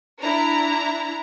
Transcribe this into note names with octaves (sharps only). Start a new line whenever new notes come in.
D4 E4 A#5